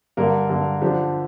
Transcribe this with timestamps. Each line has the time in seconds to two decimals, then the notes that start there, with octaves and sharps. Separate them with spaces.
0.17 G2 D3 A#3 A#4
0.50 G2 D3 A#3
0.82 D3 F3 D4 G4